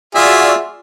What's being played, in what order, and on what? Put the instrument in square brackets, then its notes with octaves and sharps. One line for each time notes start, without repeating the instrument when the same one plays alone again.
[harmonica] F4 G#4 E5 [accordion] F#4 D5 E6